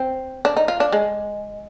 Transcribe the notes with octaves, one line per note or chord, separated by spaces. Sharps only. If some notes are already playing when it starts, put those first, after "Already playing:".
Already playing: C4
D4
D#4
F4
D4
G#3